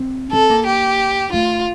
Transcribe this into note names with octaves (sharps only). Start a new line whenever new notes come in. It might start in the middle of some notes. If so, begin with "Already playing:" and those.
Already playing: C4
C4 A4
A#3
G4
A3 F4